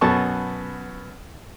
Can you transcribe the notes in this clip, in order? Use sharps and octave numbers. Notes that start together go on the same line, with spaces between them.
F#2 B2 B3 A4 A5 C#6